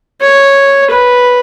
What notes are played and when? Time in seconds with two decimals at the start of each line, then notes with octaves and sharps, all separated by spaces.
0.21 C#5
0.90 B4